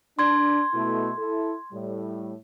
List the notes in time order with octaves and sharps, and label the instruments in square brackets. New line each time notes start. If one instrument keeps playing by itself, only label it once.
[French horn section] D4 [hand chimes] C6 G#6
[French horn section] B2 A3 E4
E4 A4
A2 G3